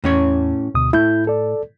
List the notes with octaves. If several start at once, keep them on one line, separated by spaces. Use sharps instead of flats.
E2 A2 C#4 C#5
D2 B2 D#6
A2 E4 G6
A4 D5